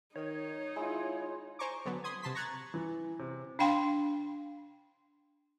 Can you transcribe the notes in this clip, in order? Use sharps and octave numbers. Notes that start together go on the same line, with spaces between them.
D#3 D#4 C#5
G#3 E4 F4
C5 G#5 A#5 C#6 D6
D3 F#3 B3
B5 C6 D#6 G#6
C3 A5 C6 B6
A#5 C#6 F#6 G#6 A6
E3
C3
D4 F5 G5 C6